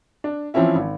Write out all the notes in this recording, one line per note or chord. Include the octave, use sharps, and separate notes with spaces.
D4
E3 F3 C4 C#4 E4
G#1